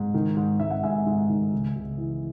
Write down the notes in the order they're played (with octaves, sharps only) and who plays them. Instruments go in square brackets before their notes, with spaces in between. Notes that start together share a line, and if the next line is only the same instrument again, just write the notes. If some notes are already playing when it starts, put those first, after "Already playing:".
Already playing: [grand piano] G#2
D#3
G#2
G#2 E5
F#5
G#2 E5 G#5
G#2
D#3
C#2
C#2
E3